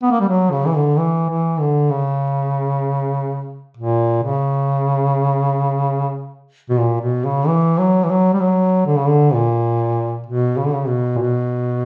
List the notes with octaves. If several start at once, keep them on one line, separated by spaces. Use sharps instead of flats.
B3
A#3
G3
F#3
C#3
E3
D3
E3
E3
D3
C#3
A#2
C#3
B2
A#2
B2
C#3
E3
F#3
E3
F#3
G3
F#3
D3
C#3
D3
A#2
B2
C#3
D3
C#3
B2
A#2
B2